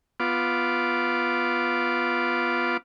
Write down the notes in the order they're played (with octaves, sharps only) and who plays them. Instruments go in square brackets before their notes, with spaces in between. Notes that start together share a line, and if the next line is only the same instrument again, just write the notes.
[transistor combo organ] B3 F4 D6